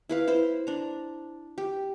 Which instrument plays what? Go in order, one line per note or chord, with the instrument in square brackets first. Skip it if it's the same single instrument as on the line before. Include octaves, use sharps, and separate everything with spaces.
[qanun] E4 B4 F5
E4 C5
D4 A#5
G4